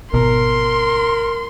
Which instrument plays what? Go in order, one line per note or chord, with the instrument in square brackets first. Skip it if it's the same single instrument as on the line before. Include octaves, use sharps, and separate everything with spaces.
[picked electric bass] G#1 B2 [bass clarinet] A#4 [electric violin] C6